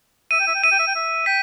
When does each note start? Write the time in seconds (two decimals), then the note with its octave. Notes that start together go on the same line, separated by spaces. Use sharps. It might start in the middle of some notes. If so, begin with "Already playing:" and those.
0.31 E5 D#7
0.40 G5
0.47 E5
0.55 G5
0.63 E5 D#7
0.71 G5
0.79 E5
0.88 G5
0.95 E5
1.26 G5 B6